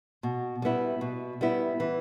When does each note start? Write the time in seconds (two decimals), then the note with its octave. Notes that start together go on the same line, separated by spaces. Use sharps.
0.23 B2
0.62 G3 B3 E4
1.01 B2
1.41 G3 B3 E4
1.80 E3